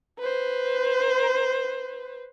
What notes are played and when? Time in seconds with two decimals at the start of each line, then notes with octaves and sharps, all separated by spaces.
0.19 B4 C5